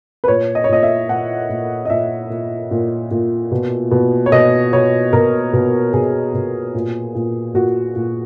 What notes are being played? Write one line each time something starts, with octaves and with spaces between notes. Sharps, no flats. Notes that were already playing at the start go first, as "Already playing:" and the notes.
B4
A#2 C#5
D#5
C#5
A#2 D#5
E5
A#2 F#5
A#2
D#5
A#2 E5
A#2
A#2
A#2
B2
B2
C#5
B2 D#5
B2 C#5
B2 A#4
B2
B2 G#4
B2
A#2
A#2
A#2 F#4
A#2